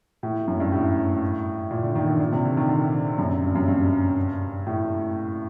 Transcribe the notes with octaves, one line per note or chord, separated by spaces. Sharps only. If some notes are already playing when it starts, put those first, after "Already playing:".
A2
F#2
G2
A2
A#2
D3
D#3
D3
A#2
C3
D3
D#3
D3
F#2
G2
F#2
G2
A2